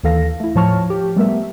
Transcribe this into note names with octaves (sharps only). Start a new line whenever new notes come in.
D#2 E3 A4 F5 A#6
A3 E4
A2 F3 C#5 A5 C#6 F6
G4
G3 A3 B3 A#4 E5